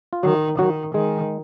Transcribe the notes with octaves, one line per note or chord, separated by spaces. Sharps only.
F4
D#3 F#3 F#4
D#3 F#3 F#4
D#3 G#3 G#4